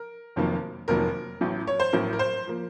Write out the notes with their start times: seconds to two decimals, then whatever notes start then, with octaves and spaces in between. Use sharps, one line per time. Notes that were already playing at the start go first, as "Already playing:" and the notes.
Already playing: A#4
0.36 F1 F2 D#3 F#3 A#3
0.88 F1 F2 D#3 F#3 A#3 A#4
1.41 A1 A2 F#3
1.67 C#5
1.80 C5
1.93 A1 A2 F#3 A#4
2.13 A#4
2.19 C5
2.47 F3 A#3